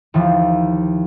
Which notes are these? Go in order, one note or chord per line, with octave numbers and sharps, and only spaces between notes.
D#2 E3 F3